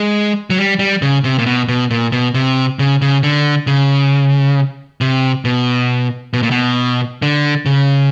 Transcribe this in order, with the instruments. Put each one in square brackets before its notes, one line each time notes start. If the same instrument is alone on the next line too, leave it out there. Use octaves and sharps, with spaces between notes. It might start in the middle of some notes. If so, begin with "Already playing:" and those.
Already playing: [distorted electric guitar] G#3
F#3
G3
G3
C#3
C3
A#2
B2
B2
A#2
B2
C3
C#3
C#3
D3
C#3
C3
B2
B2
A#2
B2
D3
C#3